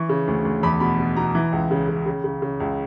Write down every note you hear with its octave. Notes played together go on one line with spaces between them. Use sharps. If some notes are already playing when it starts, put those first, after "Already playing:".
Already playing: E3 C#6
C#3
D2
D2
E2 B5
B2 B5
B2
B2 A#5
E3
C#2
C#3
C#3
C#3
C#3
C#3
C#2